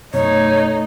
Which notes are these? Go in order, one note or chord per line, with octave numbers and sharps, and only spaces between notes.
F#2 B2 A3 D#4 C#5